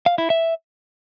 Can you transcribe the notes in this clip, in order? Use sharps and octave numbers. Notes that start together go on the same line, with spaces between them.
F5
E4
E5